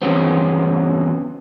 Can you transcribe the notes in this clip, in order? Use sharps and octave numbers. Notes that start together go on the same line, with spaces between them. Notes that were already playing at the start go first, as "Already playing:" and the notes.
E2 G2 C#3 F#3 B3 C4